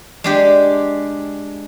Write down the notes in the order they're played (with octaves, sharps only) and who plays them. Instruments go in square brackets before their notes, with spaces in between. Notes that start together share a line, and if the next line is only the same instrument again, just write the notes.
[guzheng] G#3 D4 G4